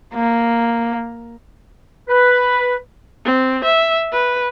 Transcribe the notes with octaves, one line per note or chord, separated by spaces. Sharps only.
A#3
B4
C4
E5
B4